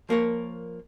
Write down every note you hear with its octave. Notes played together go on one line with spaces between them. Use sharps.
F3 A#3 A#4 C#5